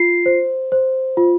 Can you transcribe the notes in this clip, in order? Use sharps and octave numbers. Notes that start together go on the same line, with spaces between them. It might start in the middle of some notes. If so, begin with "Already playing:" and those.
Already playing: F4 C7
C5
C5
F4